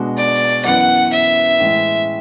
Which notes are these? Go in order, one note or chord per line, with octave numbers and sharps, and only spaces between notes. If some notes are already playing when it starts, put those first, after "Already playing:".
Already playing: B2 G#3 D4 F#4
D5
F#2 E3 B3 F#5
E5
A2 E3 G#3